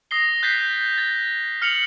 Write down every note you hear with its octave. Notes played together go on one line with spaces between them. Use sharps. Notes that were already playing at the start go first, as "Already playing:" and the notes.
D#6 A#6 C7 G7
F#6 G6 A6 B6 C7
A6
F6 C#7 F7 F#7